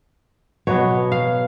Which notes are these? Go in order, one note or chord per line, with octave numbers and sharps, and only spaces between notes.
B2 F#3 B3 C#5
F5